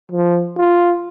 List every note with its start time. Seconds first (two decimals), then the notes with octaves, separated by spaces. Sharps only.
0.11 F3
0.57 F4